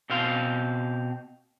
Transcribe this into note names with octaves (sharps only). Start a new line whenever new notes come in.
B2 C4 F5 C6